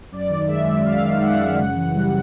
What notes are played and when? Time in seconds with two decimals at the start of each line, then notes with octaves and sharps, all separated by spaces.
0.12 F#2 D5
0.30 D#3
0.48 G#3 E5
0.66 F#2
0.85 F#2 F5
1.02 D#3
1.22 G#3 F#5
1.39 F#2
1.57 C#3
1.76 E3
1.94 G3